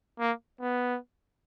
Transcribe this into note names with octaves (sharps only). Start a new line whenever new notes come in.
A#3
B3